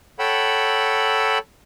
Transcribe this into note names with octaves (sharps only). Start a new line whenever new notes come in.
A4 C#5 F#5 G5 B5 E6